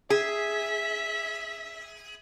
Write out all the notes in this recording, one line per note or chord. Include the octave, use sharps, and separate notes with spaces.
G#4 E5 B6